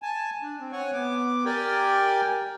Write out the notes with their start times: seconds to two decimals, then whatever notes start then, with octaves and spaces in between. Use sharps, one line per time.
0.02 G#5 A5
0.42 D4
0.60 C4
0.73 C#5 F#5 G#5 C#6
0.93 B3 D6
1.45 G4 A#4 D5 G5 G#5